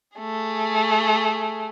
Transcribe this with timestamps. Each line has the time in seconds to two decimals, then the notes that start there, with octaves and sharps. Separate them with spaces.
0.18 A3 G#4